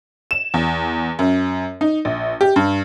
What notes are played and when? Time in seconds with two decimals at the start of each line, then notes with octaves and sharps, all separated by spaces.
0.31 E7
0.54 E2
1.19 F#2
1.81 D#4
2.05 A#1
2.41 G4
2.56 G2